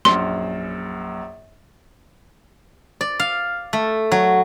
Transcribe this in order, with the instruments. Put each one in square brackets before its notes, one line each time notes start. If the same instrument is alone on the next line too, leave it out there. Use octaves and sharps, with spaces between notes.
[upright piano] A#1 F#2 [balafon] C6
[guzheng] D5
F5
A3
F#3